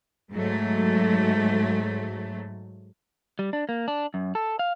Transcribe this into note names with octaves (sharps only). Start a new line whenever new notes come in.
G#2 F#3 A3
G3
D4
A#3
D4
F#2
A4
F5